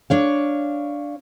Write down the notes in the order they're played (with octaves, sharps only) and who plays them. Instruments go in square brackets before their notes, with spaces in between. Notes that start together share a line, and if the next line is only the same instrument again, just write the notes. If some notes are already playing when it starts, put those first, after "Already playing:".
[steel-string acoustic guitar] D4 C#5 F5